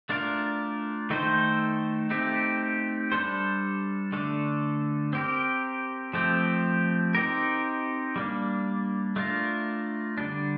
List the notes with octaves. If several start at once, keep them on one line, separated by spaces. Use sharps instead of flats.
A3 D4 F4 A#4
D#3 A3 D#4 A4 C5
A3 C4 D#4 G4
G3 D4 A4 C5
D3 A3 D4 A4
C4 G4 A#4
F3 A3 C4 G4
C4 D#4 G4 A#4
G3 A#3 D4
A3 D4 F4 A#4
D3 G3 D4